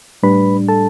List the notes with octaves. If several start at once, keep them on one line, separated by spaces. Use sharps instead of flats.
A2 G3 D4 B4 B5
A4 A5